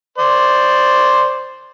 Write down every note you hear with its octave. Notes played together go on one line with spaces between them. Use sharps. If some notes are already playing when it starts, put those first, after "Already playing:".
C5 D5